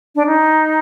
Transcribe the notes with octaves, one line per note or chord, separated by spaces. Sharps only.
D4
D#4